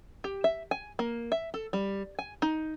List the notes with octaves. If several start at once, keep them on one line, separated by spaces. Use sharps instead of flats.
G4
E5
G#5
A#3
E5
A4
G3
G#5
D#4